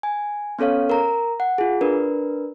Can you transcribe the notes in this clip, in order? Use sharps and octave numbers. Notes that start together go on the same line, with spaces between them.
G#5
B3 C#4 A4 C#5 F5
A#4 A#5
F#5
F4 G#4
D4 A#4 B4